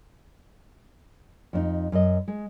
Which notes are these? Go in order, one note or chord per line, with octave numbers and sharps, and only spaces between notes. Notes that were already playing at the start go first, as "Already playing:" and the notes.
F2 D4 D#4
F#2 D#5
G#3